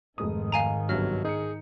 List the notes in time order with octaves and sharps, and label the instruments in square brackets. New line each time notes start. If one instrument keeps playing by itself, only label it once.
[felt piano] F1 G#3 D#6 [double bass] G#2 D#3
[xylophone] F5 G#5 A#5
[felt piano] G1 C2 D3 [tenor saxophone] F#3 [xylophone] F6
[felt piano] D#4 C#7 [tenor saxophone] G#4